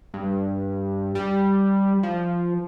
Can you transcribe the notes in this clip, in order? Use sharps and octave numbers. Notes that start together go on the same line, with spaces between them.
G2
G3
F3